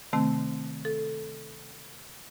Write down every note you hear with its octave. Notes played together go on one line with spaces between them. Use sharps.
C3 D#3 A3 C4
A4